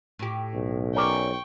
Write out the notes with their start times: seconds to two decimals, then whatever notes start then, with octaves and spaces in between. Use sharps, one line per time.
0.19 A2 G4
0.54 B1
0.95 C#4 A#4 D5 G5 C#6